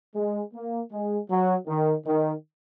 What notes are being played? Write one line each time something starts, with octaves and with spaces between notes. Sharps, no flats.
G#3
A#3
G#3
F#3
D#3
D#3